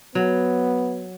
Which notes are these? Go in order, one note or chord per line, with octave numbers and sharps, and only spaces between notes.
F#3 B3